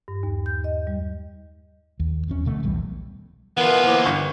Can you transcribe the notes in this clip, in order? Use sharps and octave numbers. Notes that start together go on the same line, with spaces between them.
G2
D#2
G6
D#5
G3
D#2
E1 F2 C#4
D2 B2 A3
D1 B1 E2 G3
E3 B3 F4 A#4
A#3 E4 C5 D6
G1 D4 C#6